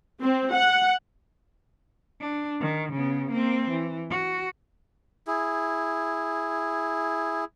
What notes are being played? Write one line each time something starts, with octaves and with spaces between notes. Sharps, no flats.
C4
F#5
D4
D#3
C#3 B3
A#3 C4
E3
F#4
E4 G#4